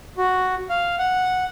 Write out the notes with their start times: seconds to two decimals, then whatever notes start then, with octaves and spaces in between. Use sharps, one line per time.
0.18 F#4
0.69 F5
0.98 F#5